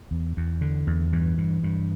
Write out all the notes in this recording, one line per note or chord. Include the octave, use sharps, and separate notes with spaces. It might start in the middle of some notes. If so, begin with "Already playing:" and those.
E2
E2
D3
E2
G2 E3
G2
G2